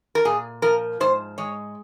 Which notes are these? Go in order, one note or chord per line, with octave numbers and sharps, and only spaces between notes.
A#4
A#2 G#4
F3 A#4
G#2 C5
G#3 C#5